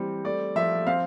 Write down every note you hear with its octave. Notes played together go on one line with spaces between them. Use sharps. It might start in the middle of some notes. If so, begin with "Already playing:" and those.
Already playing: E3 G3 C4
A3 D5
F3 E5
C4 F5